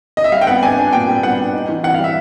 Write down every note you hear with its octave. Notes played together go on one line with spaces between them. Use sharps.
D#5
E5
G3 F5
G5
B3 F#5
D4 G#5
D4
A#2 G5
G3
B3 F#5
D4
D#4
E3
E3 F#5
F5
G3
E5